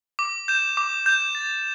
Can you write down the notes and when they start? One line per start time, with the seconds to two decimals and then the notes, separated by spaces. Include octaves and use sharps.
0.19 D6
0.48 G6 E7
0.77 D6
1.06 G6 E7
1.35 A6